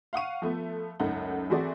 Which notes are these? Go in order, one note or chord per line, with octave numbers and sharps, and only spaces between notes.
F5 F#5 C#6 D#7
F3 A3 B3
C#2 F#2 A3 D#4 F#5
E3 A3 C4 F#4 G#4 D5